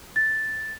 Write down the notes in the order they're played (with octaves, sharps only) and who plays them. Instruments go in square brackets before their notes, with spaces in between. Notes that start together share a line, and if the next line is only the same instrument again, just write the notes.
[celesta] A6